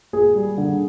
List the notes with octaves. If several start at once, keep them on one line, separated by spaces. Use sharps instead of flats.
A#2 G#4
G3
D3